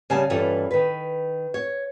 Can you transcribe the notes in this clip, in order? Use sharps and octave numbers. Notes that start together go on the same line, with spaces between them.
C#3 G3 G#5 A5
G2 E3 C#4 F4 A4
D#3 B4
C#5